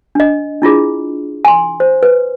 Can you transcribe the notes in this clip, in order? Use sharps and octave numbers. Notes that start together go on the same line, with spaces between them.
D4 D#5
D4 E4 F4 G#4
G#5 C6
C5
B4